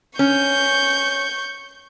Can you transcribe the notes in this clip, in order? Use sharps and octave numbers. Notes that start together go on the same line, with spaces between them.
C#4 C#6 G6